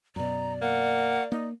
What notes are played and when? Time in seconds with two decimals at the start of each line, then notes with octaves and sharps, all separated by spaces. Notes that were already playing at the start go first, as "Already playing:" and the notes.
0.16 F#2 B2 D5 A#5
0.62 A#3 F#5
1.32 A#3 D#4